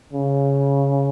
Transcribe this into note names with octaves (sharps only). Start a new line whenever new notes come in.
C#3